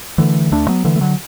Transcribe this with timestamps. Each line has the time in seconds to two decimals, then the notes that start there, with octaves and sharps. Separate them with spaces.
0.18 D3 E3 A3
0.52 D2 A3 D4
0.68 F#3 B3
0.84 D3 E3 A3
0.96 A3
1.01 D3 F#3